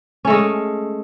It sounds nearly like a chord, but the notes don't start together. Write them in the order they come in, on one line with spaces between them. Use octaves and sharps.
C#4 A3 G#3